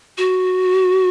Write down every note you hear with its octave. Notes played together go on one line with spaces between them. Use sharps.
F#4